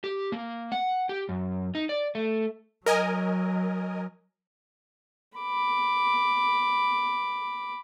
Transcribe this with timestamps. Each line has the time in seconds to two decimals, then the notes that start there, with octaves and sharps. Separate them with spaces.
0.04 G4
0.32 A#3
0.72 F#5
1.09 G4
1.29 F#2
1.75 D#4
1.89 D5
2.15 A3
2.86 F#3 A#4 D#5 G#5
5.38 B5 D6